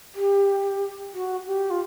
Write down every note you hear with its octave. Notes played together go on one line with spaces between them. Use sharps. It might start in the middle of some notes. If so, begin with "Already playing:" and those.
G4
F#4
G4
F4